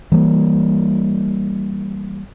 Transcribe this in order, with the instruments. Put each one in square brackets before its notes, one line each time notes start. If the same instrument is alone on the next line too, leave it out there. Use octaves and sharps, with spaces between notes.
[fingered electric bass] E3 G3 A3 A#3